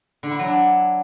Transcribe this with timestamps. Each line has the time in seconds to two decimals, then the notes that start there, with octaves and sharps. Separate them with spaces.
0.23 D3
0.31 E4
0.39 F#3
0.47 D4